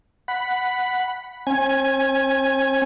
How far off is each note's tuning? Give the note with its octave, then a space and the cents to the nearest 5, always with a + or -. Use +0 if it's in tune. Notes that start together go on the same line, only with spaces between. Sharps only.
F#5 +0 B5 +0
C4 +45 G#5 +0